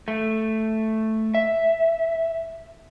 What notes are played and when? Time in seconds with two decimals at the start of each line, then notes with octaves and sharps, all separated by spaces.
0.08 A3
1.35 E5